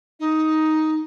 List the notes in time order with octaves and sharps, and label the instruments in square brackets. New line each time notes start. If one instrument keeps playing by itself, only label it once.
[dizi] D#4